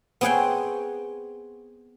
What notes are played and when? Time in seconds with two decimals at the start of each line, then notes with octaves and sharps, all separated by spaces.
0.21 B3 C4 G#4 C#5 F#5 G5